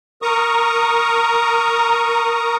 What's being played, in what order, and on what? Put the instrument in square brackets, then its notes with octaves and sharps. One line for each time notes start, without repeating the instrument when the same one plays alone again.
[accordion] A#4 A#5 C#6 D#6